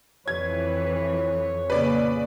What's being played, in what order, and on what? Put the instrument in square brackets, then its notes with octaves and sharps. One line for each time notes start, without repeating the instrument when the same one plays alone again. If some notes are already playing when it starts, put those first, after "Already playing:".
[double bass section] F2 [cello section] E3 B4 [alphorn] C#5 [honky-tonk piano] G#6
[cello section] A#2 C#3 [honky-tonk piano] B4 D5